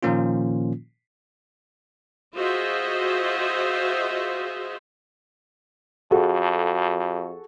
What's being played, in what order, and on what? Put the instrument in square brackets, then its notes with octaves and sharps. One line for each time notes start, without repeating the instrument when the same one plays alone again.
[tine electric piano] A#2 D#3 F3 A#3 C#4 F4
[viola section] F4 F#4 G#4 C5 D#5 E5
[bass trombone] F2 [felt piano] F#4 G#4 A4